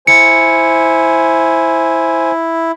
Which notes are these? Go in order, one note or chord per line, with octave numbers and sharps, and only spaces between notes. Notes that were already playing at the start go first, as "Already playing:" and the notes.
E4 C5 G#5 C#7